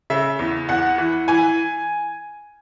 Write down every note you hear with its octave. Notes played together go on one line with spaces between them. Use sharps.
C#3 E5
E2
E2 F#5
E3
E3 G#5